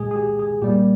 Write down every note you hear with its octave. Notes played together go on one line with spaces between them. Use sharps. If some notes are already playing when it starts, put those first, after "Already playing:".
Already playing: A#2 G#3 G#4
G#4
G4
G#4
A#2 G3 A#3 G4